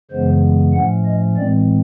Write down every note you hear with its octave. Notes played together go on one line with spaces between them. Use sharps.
F#2 C#3 E3 G#3 B3 C5
A2 F3 A3 C#4 F#5
D#5
A2 E3 G#3 C4 D5